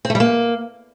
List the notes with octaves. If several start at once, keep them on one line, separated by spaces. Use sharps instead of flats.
C4
A3
G3
A#3